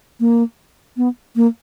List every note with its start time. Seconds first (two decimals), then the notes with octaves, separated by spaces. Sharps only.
0.20 A#3
0.97 B3
1.36 A#3